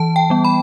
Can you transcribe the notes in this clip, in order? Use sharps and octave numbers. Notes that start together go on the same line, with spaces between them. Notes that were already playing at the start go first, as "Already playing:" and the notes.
Already playing: E3 A5
G5
G3 B3
B5